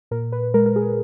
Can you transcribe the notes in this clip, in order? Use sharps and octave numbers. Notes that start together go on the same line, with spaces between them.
A#2 A#4
B4
G#3 A#4
A#4
G#4